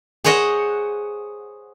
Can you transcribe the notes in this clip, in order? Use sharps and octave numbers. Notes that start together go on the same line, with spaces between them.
G#4 C5 C#5 D#5 F#5